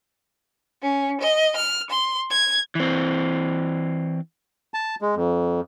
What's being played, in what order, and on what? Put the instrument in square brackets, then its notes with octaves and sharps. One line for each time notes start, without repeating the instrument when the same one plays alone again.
[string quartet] C#4
D#5
F6
C6
G#6
[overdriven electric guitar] E3 C4
[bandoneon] A5
G#3
F2